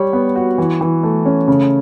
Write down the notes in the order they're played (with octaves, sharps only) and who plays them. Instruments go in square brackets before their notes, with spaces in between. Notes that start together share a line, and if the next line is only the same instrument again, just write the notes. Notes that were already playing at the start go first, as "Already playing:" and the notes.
Already playing: [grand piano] G3 C#5
B3
F#4
E3
E3
A3
C#4
C#3